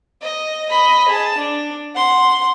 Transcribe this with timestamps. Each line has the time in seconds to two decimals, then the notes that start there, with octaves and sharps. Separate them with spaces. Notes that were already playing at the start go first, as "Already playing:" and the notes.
0.22 D#5
0.69 D#5 B5
1.08 G#4 A5
1.37 D4
1.95 F#5 C6